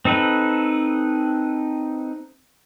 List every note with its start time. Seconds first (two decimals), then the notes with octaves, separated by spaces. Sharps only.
0.05 C4 D#4 A4 B4